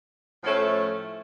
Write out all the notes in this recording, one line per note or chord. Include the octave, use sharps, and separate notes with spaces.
A2 F3 A3 C#4